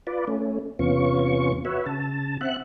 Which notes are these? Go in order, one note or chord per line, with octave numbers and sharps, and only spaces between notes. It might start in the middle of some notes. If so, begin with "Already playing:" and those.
F4 B4 D5
A3 C#4
E2 C3 B3 C#4 F4 C#6
F#4 B4 C#5 E5
C#3 A5
C4 E5 F#5 F#6